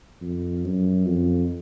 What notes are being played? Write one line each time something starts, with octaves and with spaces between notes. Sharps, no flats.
F2
F#2
F2